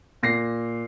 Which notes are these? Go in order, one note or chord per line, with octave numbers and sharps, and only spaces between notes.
A#2 A#6 C7